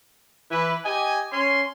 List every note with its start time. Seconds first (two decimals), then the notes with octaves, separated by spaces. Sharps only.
0.51 E3 B4
0.85 G4 D#5 G#5
1.33 C#4 C6